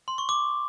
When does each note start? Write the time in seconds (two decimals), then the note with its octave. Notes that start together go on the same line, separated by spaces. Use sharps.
0.08 C6
0.18 C#6
0.29 D6